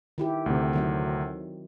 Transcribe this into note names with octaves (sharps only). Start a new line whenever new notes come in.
D#3 E4 G4
D2 C3
D#3 F#3 C4